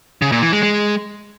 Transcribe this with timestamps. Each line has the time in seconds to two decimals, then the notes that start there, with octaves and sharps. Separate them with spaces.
0.22 C#3
0.32 A#2
0.42 E3
0.53 G#3
0.63 G#3